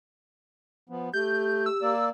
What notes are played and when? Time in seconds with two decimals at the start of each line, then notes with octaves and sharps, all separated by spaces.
0.89 F3 B3
1.13 A3 G4 G6
1.66 E6
1.82 A#3 D5